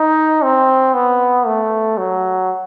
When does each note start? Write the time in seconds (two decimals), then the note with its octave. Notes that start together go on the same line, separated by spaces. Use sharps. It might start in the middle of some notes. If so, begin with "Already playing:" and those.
Already playing: D#4
0.42 C4
0.94 B3
1.46 A3
1.98 F#3